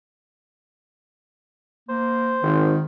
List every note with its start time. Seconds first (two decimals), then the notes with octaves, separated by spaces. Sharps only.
1.89 A#3 C5
2.43 G#1 D#3